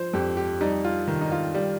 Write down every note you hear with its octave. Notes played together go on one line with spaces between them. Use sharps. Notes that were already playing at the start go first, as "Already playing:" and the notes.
Already playing: F3 C5
F2 G4
G4
G3 D#4
F4
D#3
D#4
F4
G3